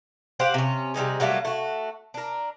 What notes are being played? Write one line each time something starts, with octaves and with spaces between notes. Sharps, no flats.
G4 C5 F5 F#5
C3 C#4
C3 G3 D#4 G#4
F#3 G3 A3 A#3
A3 F#4
D4 A#4